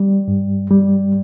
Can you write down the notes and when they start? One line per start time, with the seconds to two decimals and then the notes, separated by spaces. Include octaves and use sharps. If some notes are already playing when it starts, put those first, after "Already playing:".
Already playing: G3
0.28 G2
0.70 G3